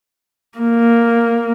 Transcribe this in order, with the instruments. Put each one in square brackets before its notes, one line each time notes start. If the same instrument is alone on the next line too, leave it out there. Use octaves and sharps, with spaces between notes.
[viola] A#3